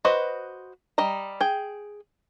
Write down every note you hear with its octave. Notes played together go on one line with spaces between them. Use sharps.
F#4 B4 C5 D#5
G3 D#5 A#5
G#4 G5